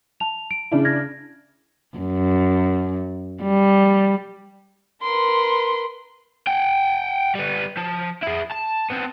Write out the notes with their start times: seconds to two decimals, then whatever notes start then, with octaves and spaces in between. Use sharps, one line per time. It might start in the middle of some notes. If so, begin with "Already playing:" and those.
0.20 A5 F7
0.51 D7
0.72 C#3 D4 E4
0.85 F6 G#6 A#6
1.98 F#2
3.43 G3
5.02 A#4 B4 C6
6.47 F#5 G5
7.35 G3 B3
7.77 F3
8.23 E4 G#4
8.51 A5
8.90 B3 C4